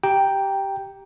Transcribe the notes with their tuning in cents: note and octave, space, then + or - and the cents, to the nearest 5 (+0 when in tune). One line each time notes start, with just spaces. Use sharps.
G4 -10 G5 +0 A#5 +0